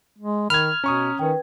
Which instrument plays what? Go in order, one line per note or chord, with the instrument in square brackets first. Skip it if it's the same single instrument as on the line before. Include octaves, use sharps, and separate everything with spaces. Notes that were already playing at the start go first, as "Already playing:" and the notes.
[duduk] G#3
[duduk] D#3 [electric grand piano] B5 G#6 [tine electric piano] F6 [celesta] F7
[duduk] B2 [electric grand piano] C#4 C#6 D#6 [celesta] A#5
[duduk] D#3 [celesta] B4 G5